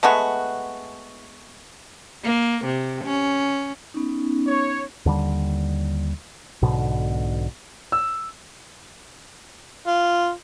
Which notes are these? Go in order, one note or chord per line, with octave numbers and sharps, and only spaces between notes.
G#3 A3 B3 F#4
A#3
C3
C#4
B3 C#4 D#4
C#5
D#2 D3 G3
B1 G#2 B2 D3
E6
F4